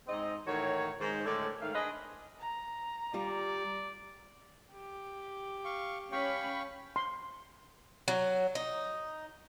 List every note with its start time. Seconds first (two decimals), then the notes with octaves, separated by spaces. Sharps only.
0.08 G#2 C4 D#5
0.47 A2 D#3 E3 F#4 C#5
0.99 G#2 D#3 C5
1.25 A2 D3 G#3 A3 C#4 D5
1.61 G#2 D#3 A3 F5
1.74 D4 G#4 B4 C5 D#5
2.39 A#5
3.14 G3 F4 D5
4.74 G4
5.65 F5 C#6
6.12 C#4 F5 G5 B5 C#6
6.96 C6
8.08 F#3
8.55 D#4